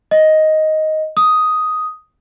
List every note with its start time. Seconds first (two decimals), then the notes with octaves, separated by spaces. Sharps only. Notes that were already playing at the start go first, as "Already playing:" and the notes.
0.11 D#5
1.17 D#6